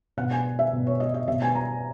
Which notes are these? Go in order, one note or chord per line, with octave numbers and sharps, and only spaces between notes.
B2 F#5
G#5
E5
B2
C#5
D#5
D#5
B2 E5
G#5
A#5